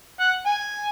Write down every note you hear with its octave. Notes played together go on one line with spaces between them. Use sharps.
F#5
G#5